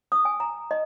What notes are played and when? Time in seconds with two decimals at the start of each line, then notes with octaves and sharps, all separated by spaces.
0.12 D#6
0.25 G#5
0.40 A#5
0.71 D#5